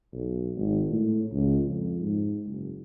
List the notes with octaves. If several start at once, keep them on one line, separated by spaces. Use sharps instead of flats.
B1
G#1
A2
C#2
F2
G#2
F#1